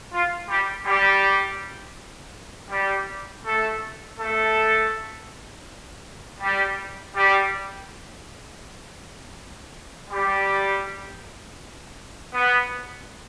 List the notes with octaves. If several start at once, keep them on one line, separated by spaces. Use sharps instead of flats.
F4
G3 G4
G3 G4
G3 G4
A3 A4
A3 A4
G3 G4
G3 G4
G3 G4
B3